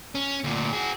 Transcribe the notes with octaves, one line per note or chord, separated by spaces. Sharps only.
C#4
D2 A#2
F#4 G#4